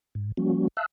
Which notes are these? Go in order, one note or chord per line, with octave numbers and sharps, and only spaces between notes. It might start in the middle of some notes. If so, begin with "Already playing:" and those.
G#2
F3 G3 A#3 C#4 F#4
E5 F5 A5 E6 F#6